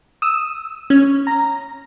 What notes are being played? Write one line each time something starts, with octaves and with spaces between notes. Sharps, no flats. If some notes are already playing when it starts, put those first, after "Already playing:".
D#6 E6
C#4
A#5